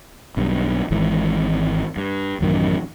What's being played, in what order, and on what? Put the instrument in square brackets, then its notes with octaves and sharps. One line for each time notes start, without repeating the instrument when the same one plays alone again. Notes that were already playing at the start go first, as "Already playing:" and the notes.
[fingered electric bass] B1 G2
G#1 G#2 E3
G2
A1 F#2 D#3